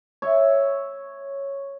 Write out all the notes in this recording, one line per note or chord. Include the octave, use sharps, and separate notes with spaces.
C#5 E5